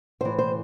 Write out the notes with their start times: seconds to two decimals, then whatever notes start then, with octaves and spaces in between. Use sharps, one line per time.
0.21 A2 E3 C5
0.39 C5